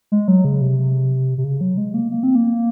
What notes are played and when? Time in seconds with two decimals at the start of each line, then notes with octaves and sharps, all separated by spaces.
0.12 G#3
0.28 F#3
0.45 C#3
0.61 C3
1.38 C3
1.44 C#3
1.61 F#3
1.77 G#3
1.94 A#3
2.11 A#3
2.23 C4
2.35 A#3